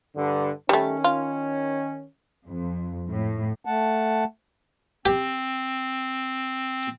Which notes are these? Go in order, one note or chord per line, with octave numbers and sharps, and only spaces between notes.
G2 D3
D#3 G3 A3 C#4
F4
F2
A2
A3 F#5 A5
C4 G4